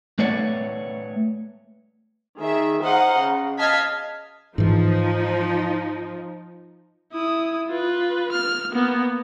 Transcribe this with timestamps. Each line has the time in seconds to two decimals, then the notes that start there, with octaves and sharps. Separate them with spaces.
0.19 A3 B4 C#5 D5 F#5
2.39 D#3 G#4 E5
2.83 C5 D#5 F5 F#5 A#5
3.18 C#3
3.58 D#5 F5 A5 F6 G#6 B6
4.58 G#2 E3 F3 D#4
7.13 E4 D#6
7.69 F4 B4
8.32 F6
8.72 A#3 B3